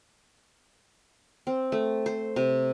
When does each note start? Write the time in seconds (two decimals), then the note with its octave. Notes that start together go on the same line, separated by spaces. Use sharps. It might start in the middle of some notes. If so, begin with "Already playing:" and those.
1.47 C4
1.72 A3
2.06 C5
2.36 C3